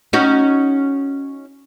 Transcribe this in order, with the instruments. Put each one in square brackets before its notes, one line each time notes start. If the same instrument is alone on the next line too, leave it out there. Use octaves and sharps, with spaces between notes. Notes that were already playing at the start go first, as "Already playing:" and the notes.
[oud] C#4 D#4 F#4